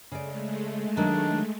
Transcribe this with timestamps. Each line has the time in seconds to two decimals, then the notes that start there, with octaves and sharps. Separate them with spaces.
0.12 C#3 G#3 A3 D5
0.97 D#3 F#3 D4